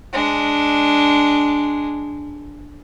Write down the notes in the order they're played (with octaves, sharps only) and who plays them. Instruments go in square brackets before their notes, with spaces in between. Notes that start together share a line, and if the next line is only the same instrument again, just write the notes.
[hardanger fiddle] G#3 D4